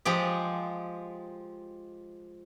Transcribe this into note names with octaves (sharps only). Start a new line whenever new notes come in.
F3 G#3 G4